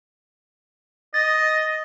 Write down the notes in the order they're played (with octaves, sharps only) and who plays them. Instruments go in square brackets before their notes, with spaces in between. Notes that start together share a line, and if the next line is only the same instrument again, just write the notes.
[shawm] D#5 [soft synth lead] A6